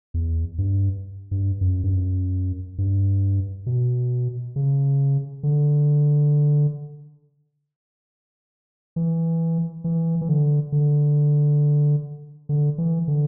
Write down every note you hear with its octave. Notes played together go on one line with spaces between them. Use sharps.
E2
G2
G2
F#2
G2
F#2
G2
B2
C#3
D3
E3
E3
E3
D3
D3
D3
E3
D3